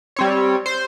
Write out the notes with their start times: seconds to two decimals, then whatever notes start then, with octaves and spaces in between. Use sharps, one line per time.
0.16 G3 C4 C#5
0.66 C5